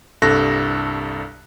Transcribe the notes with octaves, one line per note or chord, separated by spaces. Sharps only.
C2 G2 A4 F#6 A#6